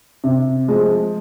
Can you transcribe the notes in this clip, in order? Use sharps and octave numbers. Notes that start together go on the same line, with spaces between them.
C3
F3 G#3